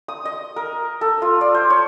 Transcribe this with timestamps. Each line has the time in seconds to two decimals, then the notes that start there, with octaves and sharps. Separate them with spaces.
0.08 D#6
0.25 D#5
0.56 A#4
1.01 A4
1.22 F4
1.41 D5
1.54 C5
1.70 C#5